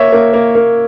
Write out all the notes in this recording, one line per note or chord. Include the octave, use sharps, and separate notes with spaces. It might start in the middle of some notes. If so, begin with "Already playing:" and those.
Already playing: A#3 C#5 E5
A#3
A#3
A#3